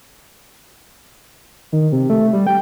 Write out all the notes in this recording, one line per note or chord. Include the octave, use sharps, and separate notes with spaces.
D#3
C3
A3
G3
G5